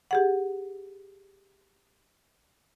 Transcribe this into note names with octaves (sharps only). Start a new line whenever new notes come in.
G4 G#4 F#5